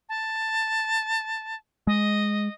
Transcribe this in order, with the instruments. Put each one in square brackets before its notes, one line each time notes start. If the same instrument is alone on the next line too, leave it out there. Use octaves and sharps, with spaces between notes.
[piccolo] A5
[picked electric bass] G#3 [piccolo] D#5